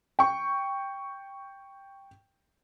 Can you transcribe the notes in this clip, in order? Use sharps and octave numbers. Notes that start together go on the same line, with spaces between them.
G5 C#6